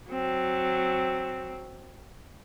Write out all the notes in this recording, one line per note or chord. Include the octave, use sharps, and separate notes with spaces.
F#3 C4